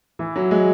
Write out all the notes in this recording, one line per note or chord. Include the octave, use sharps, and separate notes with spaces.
E3
F#3
G#3